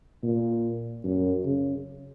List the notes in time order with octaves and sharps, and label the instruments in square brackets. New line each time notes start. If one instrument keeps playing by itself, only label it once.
[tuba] A#2
F#2
C#3